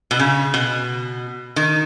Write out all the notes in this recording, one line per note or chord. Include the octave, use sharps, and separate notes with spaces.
B2
C#3
B2
D#3